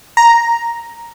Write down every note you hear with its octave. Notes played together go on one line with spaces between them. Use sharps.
A#5